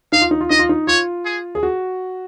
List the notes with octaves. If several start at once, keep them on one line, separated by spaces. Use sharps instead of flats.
D#4 F5
F4
D#4
F4
D#4 D#5
F4
D#4
F4 C#5
G#4
G#4
F#4